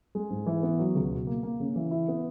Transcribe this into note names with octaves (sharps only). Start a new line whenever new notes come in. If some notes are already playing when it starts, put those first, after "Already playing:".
G#3
G#2
E3
B3
F#3
C#2
B2
A#3
A#3
C#3
E3
E4
B3